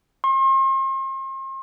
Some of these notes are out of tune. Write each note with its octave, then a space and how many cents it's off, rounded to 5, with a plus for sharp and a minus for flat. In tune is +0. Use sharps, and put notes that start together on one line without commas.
C6 +40